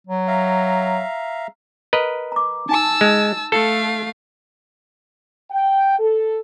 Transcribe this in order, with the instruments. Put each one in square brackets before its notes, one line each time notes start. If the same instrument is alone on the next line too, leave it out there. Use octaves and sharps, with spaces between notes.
[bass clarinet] F#3
[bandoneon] E5 F5 A#5
[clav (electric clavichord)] A#4 B4 D#5
[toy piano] A#5 D6
[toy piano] D#4 G#5 [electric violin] A5 E6
[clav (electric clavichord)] G#3
[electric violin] A3 F5 [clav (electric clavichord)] A4
[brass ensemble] G5
A4